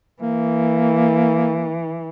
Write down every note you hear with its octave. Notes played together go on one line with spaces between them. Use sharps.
E3 A#3